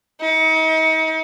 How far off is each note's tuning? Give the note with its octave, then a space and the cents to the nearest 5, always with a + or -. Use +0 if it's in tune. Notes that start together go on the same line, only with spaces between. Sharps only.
D#4 +40